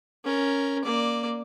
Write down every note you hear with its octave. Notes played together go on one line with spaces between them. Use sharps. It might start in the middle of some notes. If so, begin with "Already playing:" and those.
C#4 A#4
A#3 D5